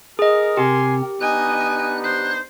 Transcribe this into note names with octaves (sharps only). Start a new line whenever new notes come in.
G#4 A#4 D#5
C3 C4 G4 G#5 C6
B3 D4 D#4 D#5 G#5 F#6
C5 F#6